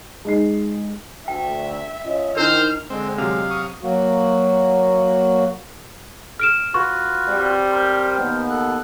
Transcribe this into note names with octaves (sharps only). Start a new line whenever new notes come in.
G#3 D#4 C7
D2 E5 G5
C#4 F4 D#5
D#3 D4 E4 A#4 C5 F6
D3 G#3 C4
C3 F#3 F5
C#6 D#6
F#3 A#3 F#4
F6 D7 E7
F4 F#4 B4 C#6
G3 C4
A#4 C5
D#2 B3
A4 F#6